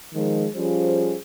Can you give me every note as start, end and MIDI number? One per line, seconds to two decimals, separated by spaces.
0.14 0.47 51
0.14 0.47 53
0.14 0.47 56
0.56 1.15 53
0.56 1.15 55
0.56 1.15 61
0.56 1.15 65
0.56 1.15 68
0.56 1.15 72